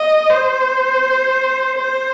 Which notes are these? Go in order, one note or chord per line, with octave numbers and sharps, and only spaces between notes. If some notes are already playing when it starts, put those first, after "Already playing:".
Already playing: D#5
C5
C5